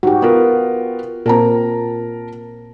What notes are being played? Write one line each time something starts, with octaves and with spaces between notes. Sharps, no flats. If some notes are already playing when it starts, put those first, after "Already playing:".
G#2 F#4 G4
B3 F4 A#4
A#2 C4 A#4 A5 A#5